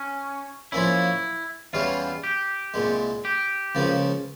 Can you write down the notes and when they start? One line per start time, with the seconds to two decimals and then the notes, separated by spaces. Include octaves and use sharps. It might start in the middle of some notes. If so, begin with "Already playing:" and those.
Already playing: C#4
0.72 A#2 F3 A#3 C#4 E4
1.73 E2 E3 G3 C#4 F4 G4
2.24 G4
2.74 C2 A#2 G#3
3.25 G4
3.75 C#2 C#3 F3 A#3